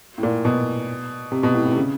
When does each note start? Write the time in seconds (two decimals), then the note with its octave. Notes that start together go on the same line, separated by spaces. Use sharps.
0.18 A2
0.23 A#2
0.45 B2
1.32 C3
1.43 B2
1.54 A2
1.65 A2
1.72 C3
1.76 C#3